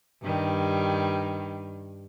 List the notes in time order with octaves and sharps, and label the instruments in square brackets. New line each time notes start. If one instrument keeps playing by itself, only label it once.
[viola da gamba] G2 D#3 G3